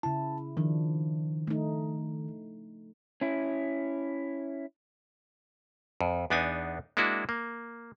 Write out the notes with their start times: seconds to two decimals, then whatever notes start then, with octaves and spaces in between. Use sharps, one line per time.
0.03 C#3 E4 A5
0.57 D#3 F3 D4
1.47 A3 D#4
3.21 C#4 E4
6.01 F2
6.30 E2 B3 D4 D#4 G#5
6.97 G#3 A#3 D4 E4 F#4
7.29 A#3